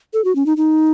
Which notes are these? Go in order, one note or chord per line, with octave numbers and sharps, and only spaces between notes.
A4
F#4
C#4
D#4
D#4